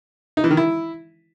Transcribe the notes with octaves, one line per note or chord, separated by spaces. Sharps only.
D#4
E3
D#3
E4